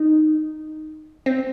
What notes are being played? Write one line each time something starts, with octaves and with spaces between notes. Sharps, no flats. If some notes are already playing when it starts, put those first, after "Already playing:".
Already playing: D#4
C4